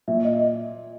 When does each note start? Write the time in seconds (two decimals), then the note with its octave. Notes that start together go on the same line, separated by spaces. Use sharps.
0.08 A#2 E5
0.25 D#5